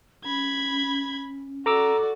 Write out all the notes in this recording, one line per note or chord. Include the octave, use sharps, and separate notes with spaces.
C#4 B5 G#6
F#4 A4 D5 A#5 D6 E6